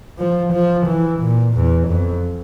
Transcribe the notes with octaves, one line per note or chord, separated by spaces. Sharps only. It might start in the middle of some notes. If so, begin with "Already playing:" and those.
F3
F3
E3
A#2
E2
F2